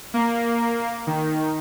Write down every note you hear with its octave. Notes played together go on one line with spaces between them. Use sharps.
A#3
D#3